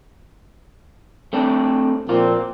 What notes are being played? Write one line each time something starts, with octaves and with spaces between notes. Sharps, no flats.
A3 C4 D4
A#2 F3 A#3 C4 F4